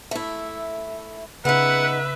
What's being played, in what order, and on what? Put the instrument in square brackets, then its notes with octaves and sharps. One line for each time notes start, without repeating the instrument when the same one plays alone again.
[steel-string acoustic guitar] A3 E4
[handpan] C#3 [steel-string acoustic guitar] B3 D#4 [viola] B4 E5 [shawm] F#5